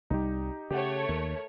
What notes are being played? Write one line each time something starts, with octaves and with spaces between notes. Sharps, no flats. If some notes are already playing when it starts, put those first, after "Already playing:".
C2 F#3 G3 D#4 G4
C#3 A3 G4 C#5 F#5
D#2 A#4